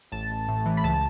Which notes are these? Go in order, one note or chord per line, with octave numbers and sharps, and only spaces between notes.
A1 A5
A1
A2
E3
B5
C#2 A5